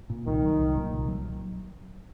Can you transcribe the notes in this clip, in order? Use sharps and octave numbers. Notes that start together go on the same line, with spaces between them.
A#2
C2 D#3
F#3
C2
A#2
C2
F#3